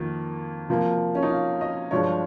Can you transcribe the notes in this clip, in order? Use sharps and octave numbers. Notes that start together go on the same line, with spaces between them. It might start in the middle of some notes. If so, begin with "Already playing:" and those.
Already playing: F2 D#3 A#3
C3 F3 A#3
C#4
D#4
F4
D#5
G2 F3 G#3 C#5